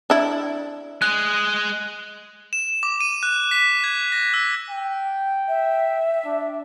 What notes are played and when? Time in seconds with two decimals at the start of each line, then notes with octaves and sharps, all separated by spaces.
0.10 D4 E4
1.02 G#3 G#4 F#6
2.53 E7
2.83 D6
3.01 D#7
3.23 F#6
3.51 B6
3.84 G#6
4.12 A#6
4.34 E6
4.70 G5
5.48 E5
6.25 D4